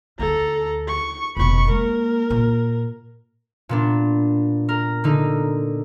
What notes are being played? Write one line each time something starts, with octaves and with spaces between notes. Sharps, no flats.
D2 A4 A#5
C#6
F1 B2 B5 C#6
G#3 A#3 A#4
A#2
A#2 B3 D4
A#4
D3 D#4